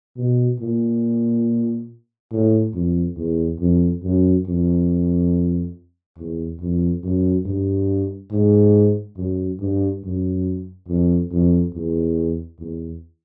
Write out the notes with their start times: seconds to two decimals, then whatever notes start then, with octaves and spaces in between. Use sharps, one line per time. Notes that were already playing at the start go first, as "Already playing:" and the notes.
0.17 B2
0.60 A#2
2.32 A2
2.74 F2
3.17 E2
3.60 F2
4.03 F#2
4.47 F2
6.18 E2
6.60 F2
7.03 F#2
7.46 G2
8.31 G#2
9.17 F#2
9.60 G2
10.04 F#2
10.88 F2
11.31 F2
11.74 E2
12.59 E2